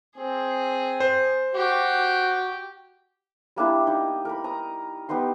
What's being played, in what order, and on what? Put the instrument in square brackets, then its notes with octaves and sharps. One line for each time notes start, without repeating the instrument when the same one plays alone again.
[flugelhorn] C4 [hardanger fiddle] G#4
[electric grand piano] C5
[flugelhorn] F#4 [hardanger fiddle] G4
[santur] G3 A#3 D4 E4
D#4
A#4 B5
A#5 D#6
G3 B3 D#4 C6